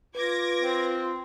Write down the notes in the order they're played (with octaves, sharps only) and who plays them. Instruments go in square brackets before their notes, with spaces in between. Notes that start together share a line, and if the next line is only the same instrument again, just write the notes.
[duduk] F4 [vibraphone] B4 [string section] D6 G#6 A#6
[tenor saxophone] C4